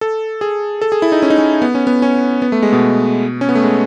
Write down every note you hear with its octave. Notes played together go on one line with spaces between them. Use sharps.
A4
G#4
A4
G#4
E4
D#4
C#4
D#4
C#4
B3
C#4
B3
C#4
B3
A3
G#3
B2
C#4
B3
A3
G#3